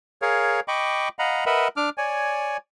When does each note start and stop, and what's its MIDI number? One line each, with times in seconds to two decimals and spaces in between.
0.22 0.60 68
0.22 0.60 70
0.22 0.60 73
0.22 0.60 77
0.68 1.09 75
0.68 1.09 79
0.68 1.09 83
0.68 1.09 85
0.68 1.09 86
1.19 1.45 75
1.19 1.45 77
1.19 1.45 78
1.19 1.45 82
1.19 1.45 83
1.46 1.68 70
1.46 1.68 71
1.46 1.68 75
1.46 1.68 76
1.46 1.68 78
1.46 1.68 83
1.77 1.90 62
1.77 1.90 86
1.77 1.90 89
1.98 2.57 73
1.98 2.57 74
1.98 2.57 80